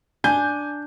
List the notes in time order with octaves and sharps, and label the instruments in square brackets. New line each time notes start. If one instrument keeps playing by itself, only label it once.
[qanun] D4 [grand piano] G#5 [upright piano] G6